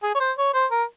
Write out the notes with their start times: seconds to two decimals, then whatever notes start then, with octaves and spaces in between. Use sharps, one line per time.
0.03 G#4
0.15 C#5
0.20 C5
0.38 C#5
0.54 C5
0.71 A#4